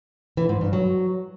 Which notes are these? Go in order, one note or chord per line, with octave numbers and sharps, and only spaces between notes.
E3
G#2
G2
F#3